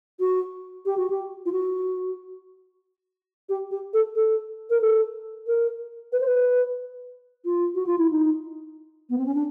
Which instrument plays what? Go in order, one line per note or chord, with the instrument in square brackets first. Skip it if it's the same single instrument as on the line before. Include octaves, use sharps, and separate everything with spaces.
[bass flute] F#4
G4
F#4
G4
F4
F#4
G4
G4
A4
A4
A#4
A4
A#4
B4
C5
B4
F4
F#4
F4
E4
D#4
B3
C4
C#4
D4